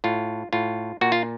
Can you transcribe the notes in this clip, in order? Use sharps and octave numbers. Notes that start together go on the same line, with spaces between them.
A2 F4
A2 F4
A#2 F#4
F4